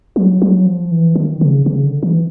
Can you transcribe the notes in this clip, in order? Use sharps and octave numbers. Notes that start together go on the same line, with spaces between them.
F#3
F#3
F3
E3
D#3
C#3
C#3
D3
E3